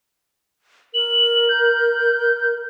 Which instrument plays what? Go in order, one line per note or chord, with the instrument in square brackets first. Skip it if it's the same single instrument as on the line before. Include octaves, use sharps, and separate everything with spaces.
[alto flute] A#4 [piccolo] F#7
[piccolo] G6